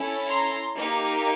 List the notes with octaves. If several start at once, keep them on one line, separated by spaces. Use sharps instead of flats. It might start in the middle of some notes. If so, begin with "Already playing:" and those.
Already playing: C#4 E4 A4
A#5 C6
A#3 D#4 G4